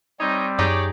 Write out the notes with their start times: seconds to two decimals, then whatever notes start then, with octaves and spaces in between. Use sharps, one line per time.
0.20 G3 C4 D#4 C#5
0.59 F#2 D#4 G4 G#4 C#5 D5